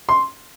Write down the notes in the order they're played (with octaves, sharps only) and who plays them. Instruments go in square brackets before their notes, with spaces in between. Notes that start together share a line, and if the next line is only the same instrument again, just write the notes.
[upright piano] C6